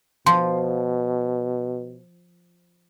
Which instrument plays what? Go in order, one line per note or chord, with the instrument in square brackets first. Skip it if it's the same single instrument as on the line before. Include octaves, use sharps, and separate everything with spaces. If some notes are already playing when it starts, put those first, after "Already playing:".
[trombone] B2 [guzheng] F3 [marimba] C6